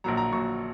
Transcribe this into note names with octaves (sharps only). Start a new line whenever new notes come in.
A#1 A#2 F#3 A#5
A#5
A#1 A#2 F#3 C#6